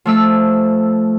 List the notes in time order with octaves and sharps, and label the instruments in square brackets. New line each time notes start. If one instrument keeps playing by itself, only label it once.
[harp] F3 A3 E6